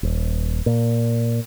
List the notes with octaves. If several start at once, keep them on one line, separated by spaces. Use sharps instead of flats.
D#1
A#2